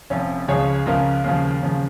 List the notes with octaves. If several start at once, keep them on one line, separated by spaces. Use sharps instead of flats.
F1 F2 F3 C#4
C#2 C#3 F3 G#4 C#5
C#2 C#3 F3 F4 A#4
D#2 C#3 F3
D#2 C#3 F3